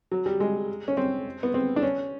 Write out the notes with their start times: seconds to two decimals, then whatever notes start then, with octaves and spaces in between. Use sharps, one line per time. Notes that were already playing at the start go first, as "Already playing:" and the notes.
0.12 F#3
0.26 G3
0.40 G#3
0.88 C#4
0.97 C4
1.43 B3
1.54 C4
1.76 D4
1.82 C#4